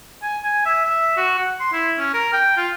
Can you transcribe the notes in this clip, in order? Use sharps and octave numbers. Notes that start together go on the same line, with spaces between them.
G#5
G#5
E5
E5
F#4
F#5
C6
E4
C#4
A#4
G5
F4